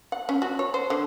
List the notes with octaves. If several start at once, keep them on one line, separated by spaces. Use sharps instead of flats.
F#5
C#4
F#4
C#5
C5
D3